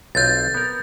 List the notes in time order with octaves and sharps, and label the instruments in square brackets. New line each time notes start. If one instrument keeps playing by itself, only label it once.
[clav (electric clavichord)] B1 C4 F4 [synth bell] G6 A6
[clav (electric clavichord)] B3 A#4